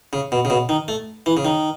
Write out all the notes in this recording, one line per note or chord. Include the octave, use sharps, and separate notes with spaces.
C#3
B2
C#3
B2
D#3
A3
E3
C#3
D#3